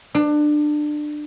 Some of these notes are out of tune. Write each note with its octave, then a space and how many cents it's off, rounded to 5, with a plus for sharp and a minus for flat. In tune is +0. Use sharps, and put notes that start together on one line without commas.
D4 +25